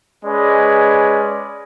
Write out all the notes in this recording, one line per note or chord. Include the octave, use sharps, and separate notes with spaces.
G#3 C#4 B4 D5